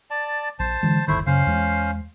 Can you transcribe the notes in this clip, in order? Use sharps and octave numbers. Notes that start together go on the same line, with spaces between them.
D5 A5
A#1 C5 A5
D3 E3 G#3
D1 G1 D#3 A3 E4 C5
F#2 C#3 C#4 C5 F5
E2 G#3